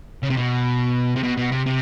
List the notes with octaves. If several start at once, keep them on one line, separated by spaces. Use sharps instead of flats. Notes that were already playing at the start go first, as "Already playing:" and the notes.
C#3
C3
B2
C3
B2
B2
C3
C3